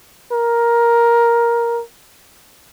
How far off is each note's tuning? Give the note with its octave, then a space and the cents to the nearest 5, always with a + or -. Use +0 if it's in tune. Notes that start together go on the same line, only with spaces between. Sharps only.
A#4 +10